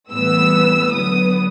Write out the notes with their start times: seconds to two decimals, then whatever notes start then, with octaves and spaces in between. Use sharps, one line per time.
0.12 A2 E3 G3 B3 E6
0.93 D3 F#3 B3 D#6